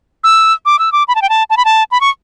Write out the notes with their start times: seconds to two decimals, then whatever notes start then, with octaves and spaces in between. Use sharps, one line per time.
0.24 E6
0.66 D6
0.79 E6
0.92 D6
1.08 B5
1.15 A5
1.22 G5
1.29 A5
1.50 A5
1.57 B5
1.65 A5
1.91 B5
2.01 C#6